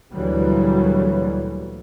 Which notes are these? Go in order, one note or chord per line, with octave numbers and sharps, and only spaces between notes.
D2 A#2 E3 F#3 G3